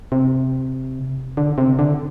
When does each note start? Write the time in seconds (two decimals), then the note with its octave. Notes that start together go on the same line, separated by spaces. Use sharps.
0.12 C3
1.37 D3
1.58 C3
1.79 D3